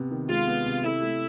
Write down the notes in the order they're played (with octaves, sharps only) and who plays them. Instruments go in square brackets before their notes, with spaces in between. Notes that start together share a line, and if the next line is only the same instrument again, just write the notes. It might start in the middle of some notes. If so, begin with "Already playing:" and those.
Already playing: [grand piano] C3 B3
D#3
[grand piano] G#3 [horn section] F4
[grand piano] B3
C3
[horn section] E4 [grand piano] A4
[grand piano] A3